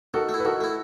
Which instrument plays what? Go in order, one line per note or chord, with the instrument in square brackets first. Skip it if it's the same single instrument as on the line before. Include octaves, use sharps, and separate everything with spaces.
[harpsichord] D#3 [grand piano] F#4 A4
[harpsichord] A3
E4
[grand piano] B4
[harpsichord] D#3 [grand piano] F#4 A4
[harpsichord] A3 E4